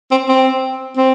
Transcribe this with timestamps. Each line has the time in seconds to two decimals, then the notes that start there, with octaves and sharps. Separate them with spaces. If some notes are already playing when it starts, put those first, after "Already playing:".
0.11 C4
0.29 C4
0.97 C4